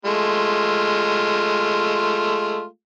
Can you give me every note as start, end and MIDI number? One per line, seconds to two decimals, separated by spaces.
0.05 2.65 56
0.05 2.65 57
0.05 2.65 65